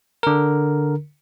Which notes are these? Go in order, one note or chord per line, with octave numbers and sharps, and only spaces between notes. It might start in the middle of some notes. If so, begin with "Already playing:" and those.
D3 A#4